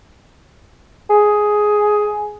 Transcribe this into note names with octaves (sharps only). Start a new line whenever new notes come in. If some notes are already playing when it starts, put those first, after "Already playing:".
G#4